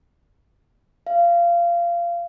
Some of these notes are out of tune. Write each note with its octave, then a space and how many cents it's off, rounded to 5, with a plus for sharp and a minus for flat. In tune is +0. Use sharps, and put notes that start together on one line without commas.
F5 -20